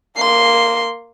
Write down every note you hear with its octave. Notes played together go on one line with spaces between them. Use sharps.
A#3 C6